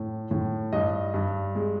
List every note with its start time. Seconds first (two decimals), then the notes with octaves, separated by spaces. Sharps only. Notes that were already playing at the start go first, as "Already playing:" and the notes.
Already playing: A2
0.31 A2
0.73 G2 D#5
1.14 G2
1.55 G#3